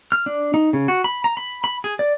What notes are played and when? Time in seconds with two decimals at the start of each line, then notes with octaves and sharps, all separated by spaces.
0.12 F6
0.26 D4
0.54 D#4
0.73 C#3
0.88 F#4
1.04 B5
1.24 A#5
1.37 B5
1.64 B5
1.84 G#4
1.99 D5